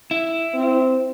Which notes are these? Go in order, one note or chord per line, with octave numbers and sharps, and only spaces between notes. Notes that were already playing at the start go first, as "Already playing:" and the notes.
E4
C4